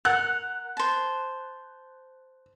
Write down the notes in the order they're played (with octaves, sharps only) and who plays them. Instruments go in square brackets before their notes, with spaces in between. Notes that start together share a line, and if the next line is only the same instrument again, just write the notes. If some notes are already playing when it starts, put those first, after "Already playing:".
[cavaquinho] A#4 F#5 [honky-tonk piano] F#6
[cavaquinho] C5 A5